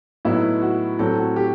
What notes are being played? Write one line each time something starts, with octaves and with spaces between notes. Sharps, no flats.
A2 F#3 B3 D#4 E4
F#4
A2 F#3 C4 A4
F#4
G4